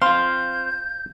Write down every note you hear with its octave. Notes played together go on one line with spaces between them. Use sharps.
C4 F4 F5 C6 G6